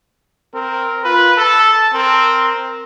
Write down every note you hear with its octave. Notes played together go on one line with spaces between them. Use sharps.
C4 A#4
F4 B4
A4 A5
C4 A#4